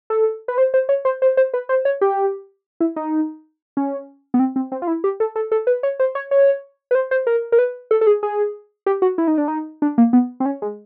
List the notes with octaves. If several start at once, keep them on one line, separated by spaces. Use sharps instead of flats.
A4
B4
C5
C5
C#5
C5
C5
C5
B4
C5
C#5
G4
E4
D#4
C#4
B3
C4
C4
C4
F4
E4
G4
A4
A4
A4
B4
C#5
C5
C#5
C#5
B4
C5
C5
A#4
A#4
B4
A4
A4
G#4
G#4
G4
F#4
E4
D#4
D4
D#4
D4
A#3
B3
C4
C#4
G#3